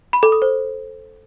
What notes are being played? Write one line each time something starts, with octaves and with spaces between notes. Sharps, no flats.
B5
A4
D#6
C5